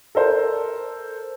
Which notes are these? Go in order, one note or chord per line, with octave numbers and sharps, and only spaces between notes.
A4 A#4 C5